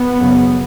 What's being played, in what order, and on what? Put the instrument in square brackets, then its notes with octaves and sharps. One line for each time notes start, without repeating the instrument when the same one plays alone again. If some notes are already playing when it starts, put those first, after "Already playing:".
Already playing: [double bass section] B3
F#2 C#3